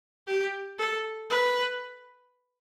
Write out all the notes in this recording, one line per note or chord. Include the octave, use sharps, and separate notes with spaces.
G4
A4
B4